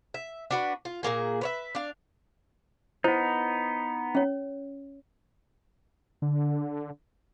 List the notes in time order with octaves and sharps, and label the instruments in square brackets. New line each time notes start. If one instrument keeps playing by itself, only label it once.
[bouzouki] E5
D4 F#4 B4
F4
A#2 G3 A#3 G#4
B4 C#5 E5
D4 F5
[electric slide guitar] B3 D#4 [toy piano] E4 C5
[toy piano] C#4 C#5
[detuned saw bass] D3